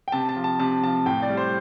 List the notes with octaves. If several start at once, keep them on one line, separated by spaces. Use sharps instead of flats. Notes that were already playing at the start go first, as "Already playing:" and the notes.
G5
C3 A5
A5
F3
A5
C3 A5
F3 A5
A2 G5
D5
G3
C5